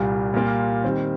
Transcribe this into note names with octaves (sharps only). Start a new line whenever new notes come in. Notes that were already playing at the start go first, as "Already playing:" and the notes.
Already playing: C2 A#2 G3 A#3
A#2 G3 A#3 F4
D#3 G3 C4